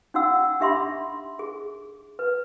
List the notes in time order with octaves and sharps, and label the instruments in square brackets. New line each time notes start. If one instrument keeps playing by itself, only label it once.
[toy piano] C#4 D#4 F#4 F5 F#5 E6
D4 G4 E5 B5 C6 D6
G#4
B4